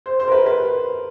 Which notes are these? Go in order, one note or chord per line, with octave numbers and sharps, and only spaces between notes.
C5
C5
A#4
B4
B4